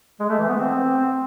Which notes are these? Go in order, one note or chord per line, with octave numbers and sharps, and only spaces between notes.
G#3
A3
E3
B3
C4